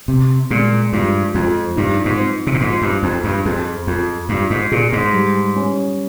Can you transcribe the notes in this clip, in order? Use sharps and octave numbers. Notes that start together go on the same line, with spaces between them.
C3 C4
A#2 G#3
G2 F3
F2 F3
G2 D#4
G#2
C4
C3
A#2
G#2 F3
G2
F2 C4
G2
F2 G#4
F2 F4
G2 F4
G#2
A#2 G#4
G#2
G3
C#4